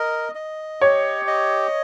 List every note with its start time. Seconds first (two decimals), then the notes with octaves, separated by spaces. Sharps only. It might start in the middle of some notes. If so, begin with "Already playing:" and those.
Already playing: A#4 D#5
0.35 D#5
0.81 G4 C#5
1.27 D#5